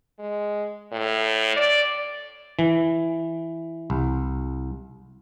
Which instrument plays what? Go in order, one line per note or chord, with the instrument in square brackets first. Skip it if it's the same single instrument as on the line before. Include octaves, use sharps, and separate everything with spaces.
[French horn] G#3
A2
D5
[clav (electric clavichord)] E3
C2